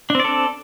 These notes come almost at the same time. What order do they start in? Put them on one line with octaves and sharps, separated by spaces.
D4 C4 D5 A4